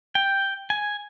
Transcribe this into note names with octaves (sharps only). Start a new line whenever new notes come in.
G5
G#5